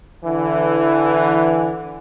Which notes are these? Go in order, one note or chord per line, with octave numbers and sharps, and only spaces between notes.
D3 E3